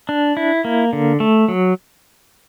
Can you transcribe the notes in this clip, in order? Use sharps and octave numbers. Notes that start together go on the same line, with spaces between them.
D4
E4
A#3
D3
A3
F#3